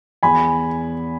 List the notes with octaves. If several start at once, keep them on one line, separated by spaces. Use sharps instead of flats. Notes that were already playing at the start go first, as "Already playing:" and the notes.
E2 G#5 B5